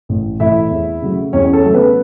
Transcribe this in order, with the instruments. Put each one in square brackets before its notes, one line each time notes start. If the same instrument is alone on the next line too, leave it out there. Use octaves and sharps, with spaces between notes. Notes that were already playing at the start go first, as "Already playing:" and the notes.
[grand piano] A1
A2 E3 A3 E4 E5
E2
C#3 F#3 A3
E2 C#4 C#5
A4
C#3 F#3 A3
B3 B4